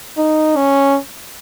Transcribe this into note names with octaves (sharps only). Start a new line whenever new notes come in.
D#4
C#4